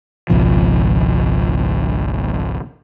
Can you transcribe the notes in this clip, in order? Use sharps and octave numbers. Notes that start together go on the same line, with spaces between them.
G#1 C#2 B2 F3